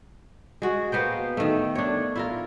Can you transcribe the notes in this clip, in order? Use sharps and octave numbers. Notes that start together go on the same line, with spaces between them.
G#3 F#4
A#3 B3 C5 G5
D#3 A3
D4 C#5
E4 F4 A#4